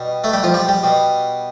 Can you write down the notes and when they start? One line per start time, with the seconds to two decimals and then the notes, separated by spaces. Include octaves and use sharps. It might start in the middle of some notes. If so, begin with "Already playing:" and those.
Already playing: B2 G3
0.24 A3 A4
0.33 G3 G4
0.43 F3 F4
0.54 G3 G4
0.68 G3 G4
0.83 B2 G3